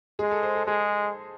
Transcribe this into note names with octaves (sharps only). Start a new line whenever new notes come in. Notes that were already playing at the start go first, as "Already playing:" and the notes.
G#3 G#4
A4
C5
A4
G#3 G#4